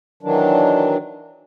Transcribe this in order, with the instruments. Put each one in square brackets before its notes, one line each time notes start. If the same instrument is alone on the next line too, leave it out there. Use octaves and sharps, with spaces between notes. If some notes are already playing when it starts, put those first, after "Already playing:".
[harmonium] D#3 E3 F#3 D4